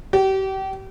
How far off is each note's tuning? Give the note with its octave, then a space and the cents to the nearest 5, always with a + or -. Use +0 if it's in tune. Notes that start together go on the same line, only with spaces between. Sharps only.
G4 -35